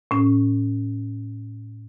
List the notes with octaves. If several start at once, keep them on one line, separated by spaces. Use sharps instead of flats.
A2 C#4